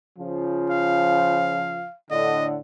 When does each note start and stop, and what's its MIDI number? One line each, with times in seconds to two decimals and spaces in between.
0.18 1.86 49
0.18 1.86 53
0.70 1.96 77
2.11 2.58 45
2.11 2.58 50
2.11 2.47 75